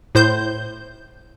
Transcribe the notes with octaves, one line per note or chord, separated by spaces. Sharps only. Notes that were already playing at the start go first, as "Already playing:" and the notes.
A2 C5 G6